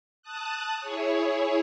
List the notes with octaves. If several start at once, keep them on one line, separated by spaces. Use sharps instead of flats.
A5 D#6 F#6
E4 G#4 C#5